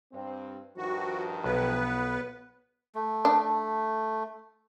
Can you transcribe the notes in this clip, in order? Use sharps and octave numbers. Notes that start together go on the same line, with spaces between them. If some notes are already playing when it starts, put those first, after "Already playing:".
G2 C4
G2 D#3 F3 F#4
B1 B3 B4
A3
D4